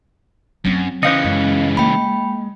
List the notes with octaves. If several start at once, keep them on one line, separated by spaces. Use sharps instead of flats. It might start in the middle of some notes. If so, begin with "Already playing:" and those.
F#2 F#3 C4
C#3 E3 C#4 C5 D#5 F5 C#7
F#2 G#3
A#3 G5 B5